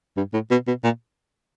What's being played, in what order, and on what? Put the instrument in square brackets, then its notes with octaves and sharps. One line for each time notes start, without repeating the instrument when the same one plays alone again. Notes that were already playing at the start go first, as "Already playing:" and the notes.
[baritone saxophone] G2
A2
B2
B2
A#2